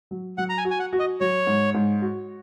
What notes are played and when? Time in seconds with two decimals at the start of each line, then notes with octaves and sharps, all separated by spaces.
0.11 F#3
0.38 F#3 F#5
0.49 A#5
0.58 G#5
0.65 F#4
0.71 G#5
0.79 F#5
0.93 F#4
0.99 D#5
1.21 F#3 C#5
1.47 G#2
1.74 G#2
2.02 F#4